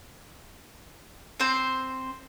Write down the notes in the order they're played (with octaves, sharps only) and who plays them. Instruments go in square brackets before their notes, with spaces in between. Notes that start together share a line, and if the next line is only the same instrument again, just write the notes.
[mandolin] C4 C5